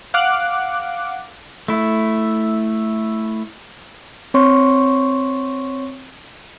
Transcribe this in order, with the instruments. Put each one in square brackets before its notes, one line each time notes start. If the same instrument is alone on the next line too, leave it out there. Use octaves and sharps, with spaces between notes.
[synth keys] F5 F#5 D6 F#6
[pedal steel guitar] A3 E4
[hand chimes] C4 C#5 C6 C#6